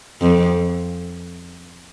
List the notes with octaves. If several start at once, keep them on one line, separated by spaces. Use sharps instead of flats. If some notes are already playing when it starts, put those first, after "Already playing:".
F2